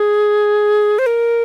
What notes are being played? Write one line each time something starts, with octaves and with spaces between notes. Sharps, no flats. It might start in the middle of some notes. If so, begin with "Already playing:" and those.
Already playing: G#4
C5
A#4